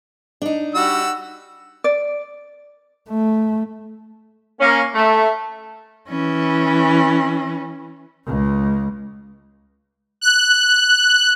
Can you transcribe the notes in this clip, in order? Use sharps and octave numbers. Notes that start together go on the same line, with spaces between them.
D4 D#4
G3 F#4 E6
D5
A3
A#3 C#4
A3
E3 C#4
C#2 G#3
F#6